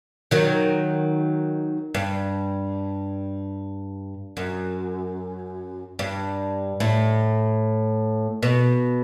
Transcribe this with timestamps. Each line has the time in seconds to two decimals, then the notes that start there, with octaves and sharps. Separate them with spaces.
0.31 D#3 F#3
1.95 G2
4.37 F#2
5.99 G2
6.80 A2
8.43 B2